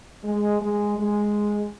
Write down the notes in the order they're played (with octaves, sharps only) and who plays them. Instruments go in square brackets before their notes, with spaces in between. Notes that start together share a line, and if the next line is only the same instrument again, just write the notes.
[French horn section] G#3
G#3
G#3